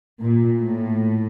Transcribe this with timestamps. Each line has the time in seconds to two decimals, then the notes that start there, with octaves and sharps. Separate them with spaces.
0.21 A#2
0.59 A2